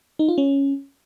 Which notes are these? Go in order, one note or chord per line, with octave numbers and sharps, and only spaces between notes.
D#4
F4
C#4